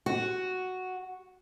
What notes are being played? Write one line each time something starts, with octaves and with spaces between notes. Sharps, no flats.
F#4